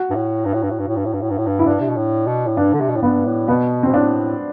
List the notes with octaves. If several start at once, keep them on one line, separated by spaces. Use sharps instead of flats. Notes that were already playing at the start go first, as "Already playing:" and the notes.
Already playing: F#4
G2
A2
G2
A2
G2
A2
G2
A2
G2
A2
G2
A2
G2
A2
G2
E4
G2 D4
C3
B2
A2
B2
A2
G2 D4
D3
C3
B2
A2
G2 B3
A2
B2 B3
C4
B2
A2 D4